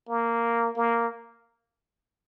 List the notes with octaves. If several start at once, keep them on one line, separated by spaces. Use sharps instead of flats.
A#3
A#3